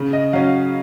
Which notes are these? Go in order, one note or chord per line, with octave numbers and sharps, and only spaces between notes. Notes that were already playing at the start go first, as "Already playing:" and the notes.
Already playing: C#3
D#5
F#3 C#4 F5